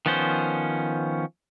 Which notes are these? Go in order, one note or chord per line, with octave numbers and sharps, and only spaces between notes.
D#3 F3 B3 C#4 C5